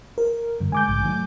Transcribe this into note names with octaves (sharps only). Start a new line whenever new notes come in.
A#4
G2 D3
G#3 G#5 D6 G6
A#1 G#2 C#3
D#3 F#3 A3